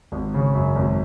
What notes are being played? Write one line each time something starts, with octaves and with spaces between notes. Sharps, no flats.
G#1
C#3
F#2
G#1